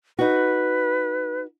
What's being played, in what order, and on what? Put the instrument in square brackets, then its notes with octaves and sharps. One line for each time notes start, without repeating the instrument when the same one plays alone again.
[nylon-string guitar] D#4 F#4 [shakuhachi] B4